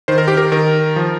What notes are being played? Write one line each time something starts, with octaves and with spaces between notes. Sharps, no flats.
D#3 C5
A#4
G4
A#4
D#3 A#4
F3